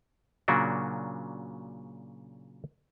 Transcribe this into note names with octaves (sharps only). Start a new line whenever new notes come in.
A#2 C#3 F#3 A#3 D4 F#4